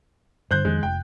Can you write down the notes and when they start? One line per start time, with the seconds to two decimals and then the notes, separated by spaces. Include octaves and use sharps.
0.51 G2 D3 C5 F#6 G6
0.65 F2 D#3 G#3
0.83 F1 G5